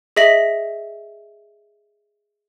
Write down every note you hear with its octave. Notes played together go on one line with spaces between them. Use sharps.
G#4 D#5 E5 A#6 B6 F#7